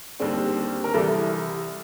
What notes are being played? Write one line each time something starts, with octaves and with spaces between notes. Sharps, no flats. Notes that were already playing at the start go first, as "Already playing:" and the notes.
D#2 D3 G3 C4
A#4
C2 C3 E3 A4